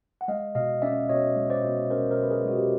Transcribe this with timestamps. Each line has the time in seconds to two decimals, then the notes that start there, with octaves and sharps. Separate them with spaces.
0.21 F#5
0.28 G#3 D#5 F5
0.55 B2 D#5 F5
0.82 C#4 D5 E5
1.09 B2 C#5 D#5
1.36 G#3
1.50 C5 D5
1.64 B2
1.91 C#4 A#4 C5
2.11 A#4 C5
2.18 B2
2.23 B4
2.31 G#4 A#4
2.45 G#3 F#4
2.56 G4